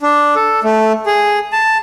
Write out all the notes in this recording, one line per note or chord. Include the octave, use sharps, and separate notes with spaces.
D4
A4
A3
G#4
A5